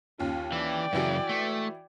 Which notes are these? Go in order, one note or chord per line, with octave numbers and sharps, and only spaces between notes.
D#2 C#4 F4
E3 D5 G5
F#2 C#3 E3 E4 F#4
A3